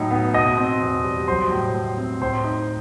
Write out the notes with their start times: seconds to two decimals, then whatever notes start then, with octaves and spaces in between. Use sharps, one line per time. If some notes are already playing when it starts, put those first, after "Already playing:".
Already playing: A2 F#3 D#4
0.11 B3
0.34 B2 D#5 D#6
0.57 C4
0.81 E2
1.04 G3
1.28 F#3 C5 C6
1.51 A2
1.74 A2
1.98 C4
2.21 A2 C5 C6
2.44 D#4